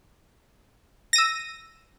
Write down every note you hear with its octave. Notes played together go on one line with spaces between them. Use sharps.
E6 A#6 D#7